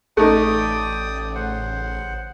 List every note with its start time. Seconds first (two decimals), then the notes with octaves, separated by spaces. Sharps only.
0.17 A1 A3 D#4 D5 G5 D#6
1.35 C#3 C5 F#5